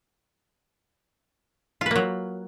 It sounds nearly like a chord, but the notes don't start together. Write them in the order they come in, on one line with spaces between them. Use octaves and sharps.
F4 B4 A#3 F#3